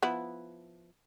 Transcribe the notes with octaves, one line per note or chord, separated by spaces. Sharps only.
F3 B3 E4